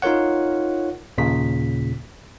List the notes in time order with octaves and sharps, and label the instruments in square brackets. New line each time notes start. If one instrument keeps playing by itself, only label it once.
[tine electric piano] D#4 F4 A#4 C#5 F#5
D#2 A#2 C#3 B6